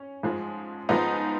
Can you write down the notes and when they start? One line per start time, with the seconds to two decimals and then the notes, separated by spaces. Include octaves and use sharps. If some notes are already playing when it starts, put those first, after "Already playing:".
Already playing: C#4
0.23 G#2 F3 G#3
0.89 G#2 F3 G#3 B3 D#4